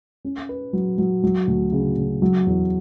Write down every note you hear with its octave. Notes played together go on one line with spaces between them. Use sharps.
C#4
B4
F#3
F#3
F#3
D2
C#3
C#3
F#3
E2